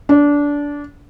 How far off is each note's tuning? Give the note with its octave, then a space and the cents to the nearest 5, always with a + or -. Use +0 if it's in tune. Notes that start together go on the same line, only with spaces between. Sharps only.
D4 -20